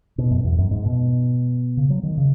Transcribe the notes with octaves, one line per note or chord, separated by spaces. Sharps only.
B2
F#2
E2
F#2
G#2
B2
C#3
F#3
D#3
C#3